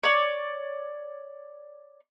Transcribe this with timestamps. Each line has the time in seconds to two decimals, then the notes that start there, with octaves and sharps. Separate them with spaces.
0.04 C#5 D5